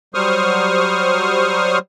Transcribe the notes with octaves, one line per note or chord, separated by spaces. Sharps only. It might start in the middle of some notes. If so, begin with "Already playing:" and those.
F#3 G3 C5 C#6 D#6 F6